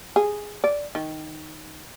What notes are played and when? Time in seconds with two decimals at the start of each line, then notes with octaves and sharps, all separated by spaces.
0.16 G#4
0.64 D5
0.95 D#3